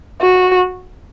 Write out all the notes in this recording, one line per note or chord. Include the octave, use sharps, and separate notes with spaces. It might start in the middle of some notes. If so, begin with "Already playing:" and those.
F#4